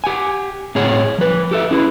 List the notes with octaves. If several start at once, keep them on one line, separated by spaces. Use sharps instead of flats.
G4 F#5 G#5
A2 C4 G#4 C#5 F#5
F3 B4
G4 A4 E5
C#4 E4 G#4 B4